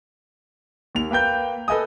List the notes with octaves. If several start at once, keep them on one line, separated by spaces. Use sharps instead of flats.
D#2 F7
A#3 B4 G5 G6
A4 B4 D#5 G#5 D#6